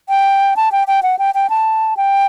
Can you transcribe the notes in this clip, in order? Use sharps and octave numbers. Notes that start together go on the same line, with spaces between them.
G5
A5
G5
G5
F#5
G5
G5
A5
G5